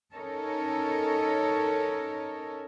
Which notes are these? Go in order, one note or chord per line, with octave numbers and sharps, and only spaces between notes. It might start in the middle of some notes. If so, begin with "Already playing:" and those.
C#4 D#4 A4 A#4 C#5